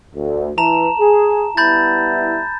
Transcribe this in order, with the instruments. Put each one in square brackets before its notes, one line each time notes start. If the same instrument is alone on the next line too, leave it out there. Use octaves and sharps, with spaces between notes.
[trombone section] D2
[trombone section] E3 [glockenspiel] A5 A#5 E7
[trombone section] G#4
[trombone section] G3 B3 E4 [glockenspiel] B5 G6 A6